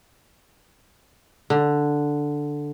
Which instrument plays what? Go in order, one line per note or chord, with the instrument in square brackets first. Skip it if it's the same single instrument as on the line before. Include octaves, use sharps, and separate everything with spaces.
[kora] D3